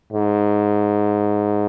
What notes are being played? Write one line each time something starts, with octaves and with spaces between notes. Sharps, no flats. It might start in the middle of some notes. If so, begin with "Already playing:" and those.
G#2